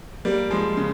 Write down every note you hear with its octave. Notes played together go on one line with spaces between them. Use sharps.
G3 A#3
F3 G#3
C#3